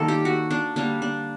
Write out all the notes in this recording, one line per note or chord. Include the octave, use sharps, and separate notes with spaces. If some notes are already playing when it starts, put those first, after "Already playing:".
Already playing: D#3 G3 A#3 A4
G4
F#4
D4
D3 G3 A#3 D4
D4